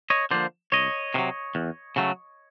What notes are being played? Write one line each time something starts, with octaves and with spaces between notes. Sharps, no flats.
C#5 D#5
D3 F3 A#3 C5 D5
C2 C#5 D#5
C3 D#3 F#3
E2
C#3 F#3 A3